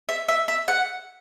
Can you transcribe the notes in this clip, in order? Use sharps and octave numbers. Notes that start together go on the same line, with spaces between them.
E5
E5
E5
F#5